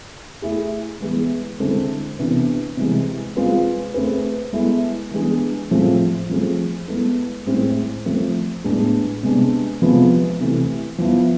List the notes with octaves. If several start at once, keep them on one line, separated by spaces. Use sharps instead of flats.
A3 E4 G#4
E3 G#3 B3 E4 G#4
D3 G#3 C4 E4 A4
C3 E3 B3 D4
C3 E3 G#3
G#3 C4 F4 G#4 B4
A3 C4 G#4 B4
G#3 B3 E4 A4
E3 G#3 B3 D4 G#4
A2 F3 A3 C4 G#4
F3 A3 C4 G#4
G#3 B3 E4 A4
A2 G#3 C4 E4 G#4
F3 A3 C4
A2 G#3 B3 D4 G#4
C3 G#3 B3 D4
C3 F3 G#3 B3
C3 E3 A3
F3 B3 E4